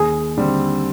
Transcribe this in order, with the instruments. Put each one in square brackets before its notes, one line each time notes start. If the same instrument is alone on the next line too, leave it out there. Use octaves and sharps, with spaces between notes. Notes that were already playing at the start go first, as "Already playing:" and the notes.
Already playing: [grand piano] D#2 [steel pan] G#4
[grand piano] D3 G3 C4